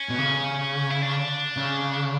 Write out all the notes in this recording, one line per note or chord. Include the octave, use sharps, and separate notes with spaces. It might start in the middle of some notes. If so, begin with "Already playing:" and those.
Already playing: C#4
B2
C#3
E4
D4
C#3